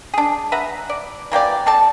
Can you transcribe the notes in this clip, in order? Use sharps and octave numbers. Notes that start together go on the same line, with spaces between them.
D4 G#4
B4 E5 F#5 A#5
D5
E3 A#3 G4 D5
C4 A4 D5 A5